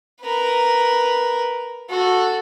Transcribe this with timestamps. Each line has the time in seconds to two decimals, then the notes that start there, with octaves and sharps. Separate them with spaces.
0.21 A#4 B4
1.90 F#4 A4